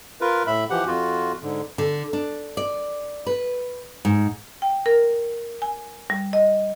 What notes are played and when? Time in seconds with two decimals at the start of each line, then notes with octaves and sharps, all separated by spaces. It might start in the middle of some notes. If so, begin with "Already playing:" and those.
0.21 F4 A#4 B4
0.47 A2 E5 B5
0.70 E3 F3 G4 F#5
0.87 F2 F4 F#4
1.43 G#2 D3
1.78 D3
2.13 D4
2.57 D5
3.26 B4
4.05 G#2
4.62 G5
4.86 A#4
5.62 G#5
6.10 G3
6.33 D#5